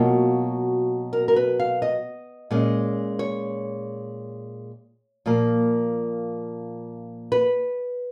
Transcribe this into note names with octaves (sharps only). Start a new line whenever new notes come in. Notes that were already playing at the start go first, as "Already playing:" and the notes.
Already playing: B2 F#3 A#3 F4
A#4
A#4
B4
F5
D#5
A#2 G#3 C#4
C#5
A#2 F3 A#3
B4